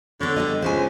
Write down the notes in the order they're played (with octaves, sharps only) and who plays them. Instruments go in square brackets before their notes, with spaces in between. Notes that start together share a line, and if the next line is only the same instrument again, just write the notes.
[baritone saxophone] D3 [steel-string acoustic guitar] B3 C#5
[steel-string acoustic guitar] G3 B3 D#5
[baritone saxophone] C#2 [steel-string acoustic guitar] C5 C#5 G#5